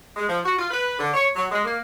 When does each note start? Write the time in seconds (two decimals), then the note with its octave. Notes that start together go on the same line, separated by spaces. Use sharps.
0.16 G#3
0.29 F3
0.45 F#4
0.58 F4
0.71 B4
0.99 D3
1.14 C#5
1.36 F#3
1.51 G#3
1.65 A#3